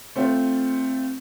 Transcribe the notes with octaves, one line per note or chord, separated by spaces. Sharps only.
A3 C4 F4